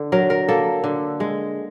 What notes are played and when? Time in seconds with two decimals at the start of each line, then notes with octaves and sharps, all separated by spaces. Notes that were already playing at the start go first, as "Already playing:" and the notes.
Already playing: D3
0.12 F#3 A#4
0.30 A#4
0.48 A#3 A4
0.84 D3
1.20 G#3